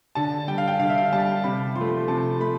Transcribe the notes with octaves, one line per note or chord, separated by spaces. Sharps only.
D3 A5
G3 G5
F5
G5
D3 F5
E5
F5
G3 A5
C3 B5
F3 C6
A3
C3 A5
A3 B5